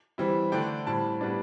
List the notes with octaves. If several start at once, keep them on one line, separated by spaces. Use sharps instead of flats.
E3 G3 C4 E4
D3 A3 D4 G5
A2 G3 C4 A5
A2 G3 B3 D4